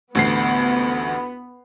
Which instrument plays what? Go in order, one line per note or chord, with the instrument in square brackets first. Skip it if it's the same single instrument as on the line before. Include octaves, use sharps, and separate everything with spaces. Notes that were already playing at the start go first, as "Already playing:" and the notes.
[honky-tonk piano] A1 D2 C7 [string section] B3